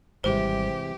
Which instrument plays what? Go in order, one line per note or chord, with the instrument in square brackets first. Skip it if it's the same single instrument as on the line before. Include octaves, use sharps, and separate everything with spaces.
[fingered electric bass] G#1 G3 [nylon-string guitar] C3 E3 G#3 [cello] G4 [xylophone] C5